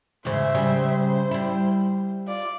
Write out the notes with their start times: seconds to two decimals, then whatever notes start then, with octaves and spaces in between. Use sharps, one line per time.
0.25 E2 G#2 C#3 C5 E5
0.55 C#3 G3
0.91 C5
1.31 G3 E4
2.27 F4 D5